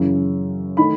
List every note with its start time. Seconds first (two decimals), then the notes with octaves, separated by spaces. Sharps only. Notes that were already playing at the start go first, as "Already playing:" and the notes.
Already playing: F#2 C#3 E3
0.77 D#3 A3 D#4 B5